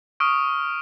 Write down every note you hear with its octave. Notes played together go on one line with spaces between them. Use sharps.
C#6 D#6 F6 D7